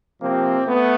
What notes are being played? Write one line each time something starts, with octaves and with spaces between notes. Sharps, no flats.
C3 F3 A#3 C4
A3 B3